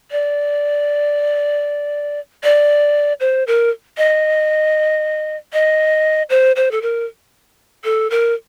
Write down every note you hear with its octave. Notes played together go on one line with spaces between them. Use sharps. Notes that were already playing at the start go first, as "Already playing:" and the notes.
D5
D5
C5
A#4
D#5
D#5
C5
C5
A4
A#4
A4
A#4